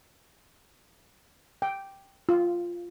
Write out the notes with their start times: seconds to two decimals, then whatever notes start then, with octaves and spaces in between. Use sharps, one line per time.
1.62 G5
2.29 F4